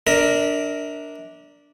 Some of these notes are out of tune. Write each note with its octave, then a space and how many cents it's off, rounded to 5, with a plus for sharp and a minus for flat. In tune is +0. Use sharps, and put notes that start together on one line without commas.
D4 -5 A#4 +0 E5 -40